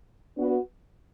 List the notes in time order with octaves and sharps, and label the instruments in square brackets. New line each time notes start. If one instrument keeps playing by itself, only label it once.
[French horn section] B3 D4 F#4 B4